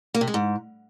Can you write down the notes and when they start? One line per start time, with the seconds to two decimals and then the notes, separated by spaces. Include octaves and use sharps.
0.14 A#3
0.21 C3
0.28 G#3
0.34 G#2